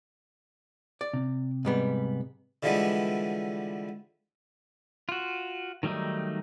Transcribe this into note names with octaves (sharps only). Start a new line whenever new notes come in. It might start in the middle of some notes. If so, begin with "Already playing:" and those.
D5
C3
G#2 G3 B3
D3 E3 F3 G3 G#3 B3
F4 F#4
D#3 F#3 G3 A3 D#4